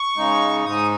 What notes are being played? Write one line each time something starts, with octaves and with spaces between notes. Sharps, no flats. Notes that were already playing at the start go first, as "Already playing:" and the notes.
Already playing: C#6
C#3 G#3 D#4
G#2 G#3 D#4 D#6